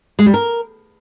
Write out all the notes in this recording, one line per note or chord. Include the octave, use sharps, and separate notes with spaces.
G#3
G3
A#4